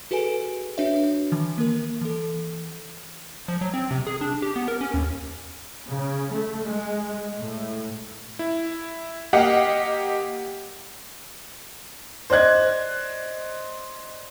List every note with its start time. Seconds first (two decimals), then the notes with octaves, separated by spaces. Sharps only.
0.11 F#4 G#4 A4 B4 G#5 D7
0.78 D4 F#4 B4 C#5 E5
1.32 D#3 E3
1.58 A#3 A#4
2.01 E3 A4
3.48 F3
3.61 F#3
3.74 C4
3.91 C3
4.07 G#4
4.21 D4
4.42 G4
4.56 B3
4.68 A#4
4.81 C#4
4.94 D#2
5.87 C#3
6.33 A3
6.63 G#3
7.38 A2
8.39 E4
9.33 A#3 G4 D#5 F5 F#5
12.30 C5 D5 D#5 F#6 G#6